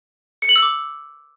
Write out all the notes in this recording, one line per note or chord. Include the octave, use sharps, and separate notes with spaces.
C#7
F#7
E6
D6